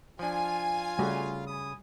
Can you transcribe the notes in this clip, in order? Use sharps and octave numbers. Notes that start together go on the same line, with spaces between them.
F3 D4 F4 G#5
C#3 G3 A3 F#4
G#5 B5 D#6